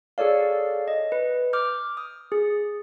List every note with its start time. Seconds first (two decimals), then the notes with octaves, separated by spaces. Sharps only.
0.18 G#4 A4 C#5 D5 F5
0.88 D#5
1.12 B4
1.53 D6 F6 G6
1.97 D#6
2.32 G#4